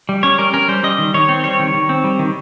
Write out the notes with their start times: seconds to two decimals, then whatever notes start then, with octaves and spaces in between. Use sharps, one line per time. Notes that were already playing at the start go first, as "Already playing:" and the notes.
0.09 G3
0.23 C#4 C#5
0.38 G3 A#4
0.54 C#4 A#4
0.68 G3 C5
0.83 G3 D#5
0.98 D#3
1.14 D#3 C#5
1.29 C4
1.44 G3 C#5
1.59 D#3
1.74 D#3
1.89 C4
2.04 G3
2.19 D#3